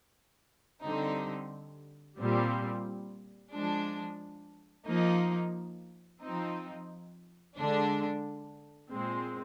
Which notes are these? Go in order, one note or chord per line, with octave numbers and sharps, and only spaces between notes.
D3 G3 C4 D#4
A#2 G3 C4
F3 G#3 D4
F3 A#3 D#4
F3 C4 D#4
D3 G#3 D4
A#2 G#3 C4